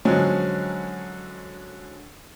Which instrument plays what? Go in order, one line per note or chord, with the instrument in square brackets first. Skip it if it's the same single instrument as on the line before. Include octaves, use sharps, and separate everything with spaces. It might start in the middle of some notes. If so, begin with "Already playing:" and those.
[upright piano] D3 F3 F#3 G#3 C#4